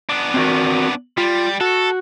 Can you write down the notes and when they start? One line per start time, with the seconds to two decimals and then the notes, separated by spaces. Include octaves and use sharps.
0.09 B3 D4
0.34 C4 F#4 A#4
1.18 G3 F4
1.61 F#4 A4